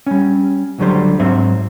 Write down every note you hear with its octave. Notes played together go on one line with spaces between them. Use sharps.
G3 C#4
C#2 D3 F#3 G3 C5
G#2 F#3 C4 C5 E5